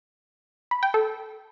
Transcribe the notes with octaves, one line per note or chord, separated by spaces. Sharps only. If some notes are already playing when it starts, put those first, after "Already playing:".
B5
G5
A4